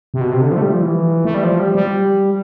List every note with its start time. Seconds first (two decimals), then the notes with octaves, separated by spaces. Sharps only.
0.14 C3
0.21 B2
0.31 C3
0.41 D3
0.52 F3
0.57 A3
0.62 G3
0.72 F3
0.83 E3
1.25 A3
1.34 G3
1.44 F3
1.59 G3
1.75 G3